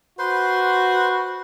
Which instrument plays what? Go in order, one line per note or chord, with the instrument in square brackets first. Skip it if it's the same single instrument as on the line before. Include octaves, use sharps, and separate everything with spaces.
[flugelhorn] F#4 [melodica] B4 C5 C6